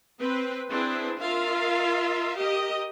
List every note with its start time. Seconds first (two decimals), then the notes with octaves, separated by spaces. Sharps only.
0.20 C4 B4
0.70 C4 D4 E4 G#4 B4
1.19 F4 A#4 E5 F5
2.38 G4 A#4 D#5